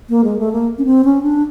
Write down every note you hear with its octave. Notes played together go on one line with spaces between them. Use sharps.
A#3
G#3
A3
A#3
C#4
C4
C#4
D4